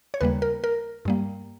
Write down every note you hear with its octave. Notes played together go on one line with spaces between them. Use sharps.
C#5
D#2 C#3 G3 A#3 B4
A#4
A#4
G2 G3 A#3